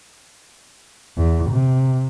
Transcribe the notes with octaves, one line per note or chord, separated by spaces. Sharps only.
E2
C3